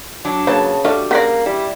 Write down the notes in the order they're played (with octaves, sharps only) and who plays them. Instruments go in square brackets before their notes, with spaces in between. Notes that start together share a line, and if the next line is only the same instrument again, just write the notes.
[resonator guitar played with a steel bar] F#3 D4
[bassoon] C#3 [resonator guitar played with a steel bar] F#3 [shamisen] A#3 [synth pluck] B4 A5
[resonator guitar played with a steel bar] G3 [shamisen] A3 F5 [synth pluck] D4 F#4 A4
[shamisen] C#3 D5 [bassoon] A#3 [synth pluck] F#5 A#6
[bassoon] G3 [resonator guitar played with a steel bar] E4